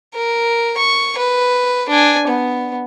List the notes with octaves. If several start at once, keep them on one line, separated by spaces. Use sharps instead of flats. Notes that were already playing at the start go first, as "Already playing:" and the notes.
A#4
C#6
B4
D4 G#5
B3